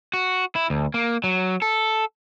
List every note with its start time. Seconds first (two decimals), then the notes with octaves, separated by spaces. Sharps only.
0.13 F#4
0.56 E4
0.70 D2
0.94 A#3
1.24 F#3
1.62 A4